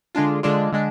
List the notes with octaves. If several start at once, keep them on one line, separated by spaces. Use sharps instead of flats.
D3 G#3 D4 F4
D3 G#3 D4 F4
D3 G#3 D4